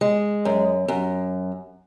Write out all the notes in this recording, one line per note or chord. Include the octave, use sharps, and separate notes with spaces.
G#3
F#2
F#2